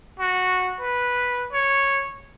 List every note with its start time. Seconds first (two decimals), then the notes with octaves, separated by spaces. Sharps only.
0.20 F#4
0.80 B4
1.53 C#5